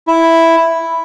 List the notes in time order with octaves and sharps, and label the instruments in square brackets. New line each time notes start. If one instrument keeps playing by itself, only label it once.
[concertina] E4